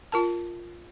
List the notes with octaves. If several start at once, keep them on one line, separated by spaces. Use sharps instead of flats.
F4 A#4 A5